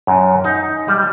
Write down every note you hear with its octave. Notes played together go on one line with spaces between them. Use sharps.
F#2
D#4
G3